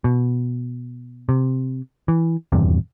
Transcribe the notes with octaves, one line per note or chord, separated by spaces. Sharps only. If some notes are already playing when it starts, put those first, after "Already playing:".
B2
C3
E3
D#1 E2 G2 C3